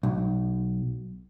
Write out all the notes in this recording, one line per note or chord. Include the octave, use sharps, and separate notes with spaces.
B1